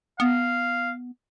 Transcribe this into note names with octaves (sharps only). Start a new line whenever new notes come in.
B3 F5